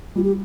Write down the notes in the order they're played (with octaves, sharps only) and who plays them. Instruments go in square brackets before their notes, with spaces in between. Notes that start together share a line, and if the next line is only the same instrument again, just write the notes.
[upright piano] G3 [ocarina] F4
[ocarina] G4